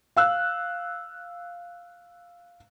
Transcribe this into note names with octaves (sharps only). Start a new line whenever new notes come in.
F5 E6 F#6